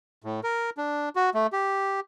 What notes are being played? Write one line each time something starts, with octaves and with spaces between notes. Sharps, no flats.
A2
A#4
D4
F#4
A3
G4